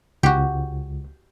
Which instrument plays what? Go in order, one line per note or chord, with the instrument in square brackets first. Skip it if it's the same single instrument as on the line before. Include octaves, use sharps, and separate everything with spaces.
[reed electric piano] C#2 [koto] F#4 G4